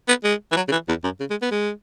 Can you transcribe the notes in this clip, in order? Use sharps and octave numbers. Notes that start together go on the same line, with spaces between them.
B3
G#3
E3
F#3
C#3
E3
E2
F#2
C#3
G#3
B3
G#3